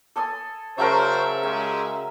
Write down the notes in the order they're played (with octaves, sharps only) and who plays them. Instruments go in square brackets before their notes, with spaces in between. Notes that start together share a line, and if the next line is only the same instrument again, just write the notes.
[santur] A4 G#5 D#6
[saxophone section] C#3 E5 [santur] F#3 A3 A#4 [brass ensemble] C5
[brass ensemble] G#3 G4 [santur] G#5